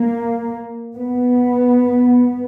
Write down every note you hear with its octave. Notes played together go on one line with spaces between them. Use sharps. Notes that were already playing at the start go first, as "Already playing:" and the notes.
Already playing: A#3
B3